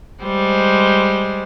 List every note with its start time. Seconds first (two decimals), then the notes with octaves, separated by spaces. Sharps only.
0.23 G3 G#3 C5